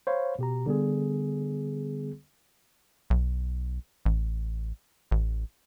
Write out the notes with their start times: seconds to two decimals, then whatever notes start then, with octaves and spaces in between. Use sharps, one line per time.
0.07 C5 C#5 F5 B5
0.39 B2 G4 A#5
0.66 D3 G3 B3 G#4
3.10 B1
4.06 A1
5.11 A1